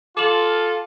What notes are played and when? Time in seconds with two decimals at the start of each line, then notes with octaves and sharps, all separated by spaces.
0.17 F4 A4 D6 E7 F#7